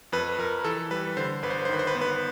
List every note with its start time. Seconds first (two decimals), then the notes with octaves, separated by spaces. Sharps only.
0.12 F2 B4
0.38 F2 A#4
0.64 E3 A4
0.91 G3 B4
1.17 D3 C5
1.43 G1 B4
1.50 C5
1.58 B4
1.65 C5
1.69 D#3 B4
1.79 C5
1.87 B4
1.95 B3 C5
2.01 B4